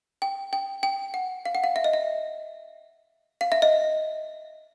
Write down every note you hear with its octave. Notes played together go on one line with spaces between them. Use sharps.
G5
G5
G5
F#5
F5
F#5
F5
E5
D#5
E5
F5
E5
D#5